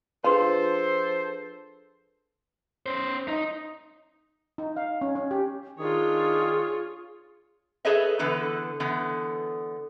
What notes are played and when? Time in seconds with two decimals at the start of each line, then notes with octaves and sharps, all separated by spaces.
0.24 F3 D4 F4 G#4 A4 B4 C5
2.86 C#4 C5
3.28 D#4
4.58 D#4
4.76 F5
5.01 C#4
5.16 C#4
5.31 G4
5.79 D#3 D4 F4 G#4 C#5 D#6
7.85 G#4 A4 B4 C#5 D#5 E5
8.19 D3 E3 B3 A4 B4
8.80 D3 E3 B3